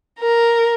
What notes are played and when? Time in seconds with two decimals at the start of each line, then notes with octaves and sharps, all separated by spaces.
0.19 A#4